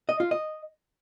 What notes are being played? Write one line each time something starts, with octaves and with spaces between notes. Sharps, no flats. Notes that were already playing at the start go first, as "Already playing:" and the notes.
D#5
F4
D#5